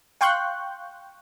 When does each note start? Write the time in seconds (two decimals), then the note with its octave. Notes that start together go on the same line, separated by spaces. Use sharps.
0.21 F5 G5 C6 C#6 F#6 G6